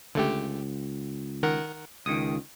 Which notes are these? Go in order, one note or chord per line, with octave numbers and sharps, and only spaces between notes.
C#2 D3 A3 G4
D#3 A#4 F#5
C#2 D#3 D#6